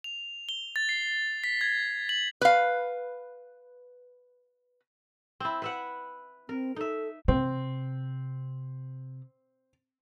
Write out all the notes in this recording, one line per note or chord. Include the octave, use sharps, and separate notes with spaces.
F7
G7
A6
C7
B6
G#6
F#7
B4 F5
C4 E4
B4 E5 F#5
C4 A#4
D#4 A4 E5
C3 C4